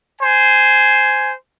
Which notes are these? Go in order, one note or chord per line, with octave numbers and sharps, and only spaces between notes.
C5 G#5